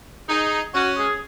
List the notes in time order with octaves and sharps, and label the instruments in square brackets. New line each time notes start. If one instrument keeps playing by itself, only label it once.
[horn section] D#4 [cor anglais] G#4
[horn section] C#4 [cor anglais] F#4
[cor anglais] G#4